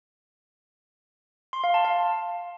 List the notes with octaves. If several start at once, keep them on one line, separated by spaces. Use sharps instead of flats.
C6
F5
A5
F5